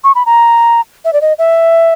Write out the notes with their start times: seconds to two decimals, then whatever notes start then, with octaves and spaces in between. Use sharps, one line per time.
0.04 C#6
0.15 B5
0.26 A#5
1.05 E5
1.13 D5
1.21 D#5
1.38 E5